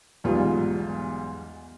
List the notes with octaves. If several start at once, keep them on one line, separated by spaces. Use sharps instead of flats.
B1 E2 G#2 G3 F4